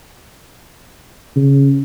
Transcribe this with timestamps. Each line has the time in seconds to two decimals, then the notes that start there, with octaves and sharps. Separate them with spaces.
1.36 C#3